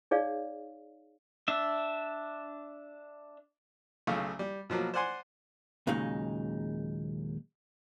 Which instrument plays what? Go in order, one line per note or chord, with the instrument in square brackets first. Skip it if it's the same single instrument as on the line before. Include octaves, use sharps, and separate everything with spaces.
[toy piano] D#4 G#4 C#5 D5 F5
[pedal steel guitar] D4 E5
[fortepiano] B1 C#3 A3 F5 C#6
G3
B2 F3 F#3 A#3
C5 D5 F#5 G#5 C6
[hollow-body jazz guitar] D#2 A#2 C#3 F#3 G#3 D#4